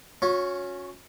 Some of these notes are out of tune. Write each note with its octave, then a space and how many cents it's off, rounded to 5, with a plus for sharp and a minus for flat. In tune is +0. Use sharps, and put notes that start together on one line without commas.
C#4 +0 F#4 -35